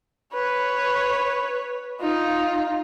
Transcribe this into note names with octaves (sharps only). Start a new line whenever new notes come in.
B4 C#5
D#4 F4